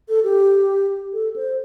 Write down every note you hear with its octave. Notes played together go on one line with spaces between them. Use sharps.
A4
G4
A4
C5